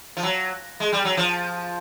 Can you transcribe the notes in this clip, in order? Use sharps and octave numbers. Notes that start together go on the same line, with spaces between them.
F3
F#3
G#3
G3
F#3
F3